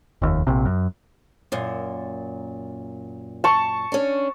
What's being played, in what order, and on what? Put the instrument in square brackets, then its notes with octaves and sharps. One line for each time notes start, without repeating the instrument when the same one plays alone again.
[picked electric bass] F1 D#2
A#1 C3
F#2
[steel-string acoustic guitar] F#2 A#2
[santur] A5 C#6
[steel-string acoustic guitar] C#4 D4